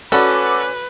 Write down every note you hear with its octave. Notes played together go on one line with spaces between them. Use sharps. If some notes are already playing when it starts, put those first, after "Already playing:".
C#4 F#4 A4 B4 D5 B5 D6